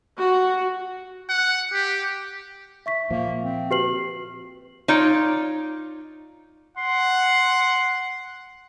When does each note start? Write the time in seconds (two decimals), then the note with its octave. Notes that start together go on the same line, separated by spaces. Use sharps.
0.17 F#4
1.29 F#5
1.73 G4
2.86 E5 C#6 B6
3.11 A#2 F3 A#3
3.42 C4
3.71 F#4 G4 B4 C7 F#7
4.88 D#4 F4 C#5 D5
6.78 F#5 C6